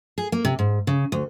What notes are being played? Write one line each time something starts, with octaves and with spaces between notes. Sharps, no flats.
G#4
A#3
C3
G#2
C#3
D2